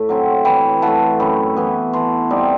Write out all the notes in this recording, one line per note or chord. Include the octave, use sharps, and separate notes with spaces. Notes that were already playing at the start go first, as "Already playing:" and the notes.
Already playing: A2 A3
F#3 C4 E4
E3 G5 B5
A3 E4 F#5 A5
F#2 G5 B5
E3 B3
E3 A5 C6
G3 C4 D#4